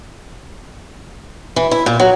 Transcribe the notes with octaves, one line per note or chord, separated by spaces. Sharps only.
E3
E4
A#2
F#3